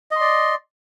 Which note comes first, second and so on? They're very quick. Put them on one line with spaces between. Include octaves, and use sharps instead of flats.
D#5 C6 D5